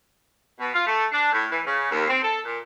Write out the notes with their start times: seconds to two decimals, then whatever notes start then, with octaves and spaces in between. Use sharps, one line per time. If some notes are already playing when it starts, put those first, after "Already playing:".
0.58 B2
0.72 F4
0.87 A3
1.10 D4
1.31 A2
1.50 E3
1.65 C#3
1.91 D#2
2.07 C4
2.21 A4
2.44 A#2